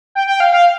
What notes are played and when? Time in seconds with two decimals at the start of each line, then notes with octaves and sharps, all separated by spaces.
0.15 G5
0.27 G5
0.40 F5
0.53 F5